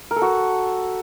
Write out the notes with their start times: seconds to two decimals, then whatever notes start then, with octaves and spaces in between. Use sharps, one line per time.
0.11 A#4
0.16 A4
0.22 F#4